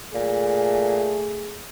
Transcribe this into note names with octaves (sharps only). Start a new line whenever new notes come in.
A#2 A3 G#4